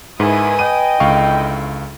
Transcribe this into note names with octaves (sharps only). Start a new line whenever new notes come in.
G#2 D#3 B3 E4 B4 G#5 D#6
D#5 G5 D#7
C#2 D3 E4 F5 C#6